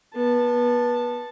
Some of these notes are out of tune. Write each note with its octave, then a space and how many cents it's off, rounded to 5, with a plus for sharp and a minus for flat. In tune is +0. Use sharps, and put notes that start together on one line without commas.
B3 -25 A5 +0